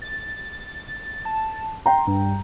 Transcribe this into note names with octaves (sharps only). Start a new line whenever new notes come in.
A6
A5
G5 A#5 C6
G2